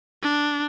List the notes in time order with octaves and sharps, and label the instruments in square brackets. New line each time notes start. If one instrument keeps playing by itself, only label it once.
[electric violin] D4